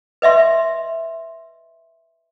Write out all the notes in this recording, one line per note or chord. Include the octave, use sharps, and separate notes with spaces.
B4 D#5 E5 C6